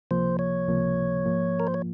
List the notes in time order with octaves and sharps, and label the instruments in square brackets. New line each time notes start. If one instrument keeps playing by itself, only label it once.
[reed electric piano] C#2 C3 F3 A#3 [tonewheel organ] C5
[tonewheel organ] C#5
[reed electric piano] C#2 C3 F3 A#3
G#2 F3 A#3 F4
[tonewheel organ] A#4
C5
C#5